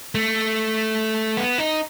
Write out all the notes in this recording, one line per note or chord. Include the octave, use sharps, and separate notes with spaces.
A3
B3
D#4